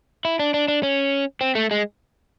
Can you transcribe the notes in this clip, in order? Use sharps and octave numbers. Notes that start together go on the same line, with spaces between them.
E4
D4
D4
D4
C#4
C4
A3
G#3